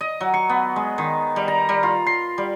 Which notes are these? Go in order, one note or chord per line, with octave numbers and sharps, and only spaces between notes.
D#5
F#3
C#6
B3
G#3
D#3
G3
A#5
G3
F4
C6
G3